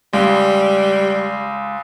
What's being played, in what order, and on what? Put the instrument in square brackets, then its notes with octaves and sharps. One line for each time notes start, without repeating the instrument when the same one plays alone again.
[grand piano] C#2 [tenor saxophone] G3